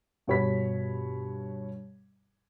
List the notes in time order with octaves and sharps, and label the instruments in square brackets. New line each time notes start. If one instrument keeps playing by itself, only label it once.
[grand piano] G2 B2 C#5 B5 B6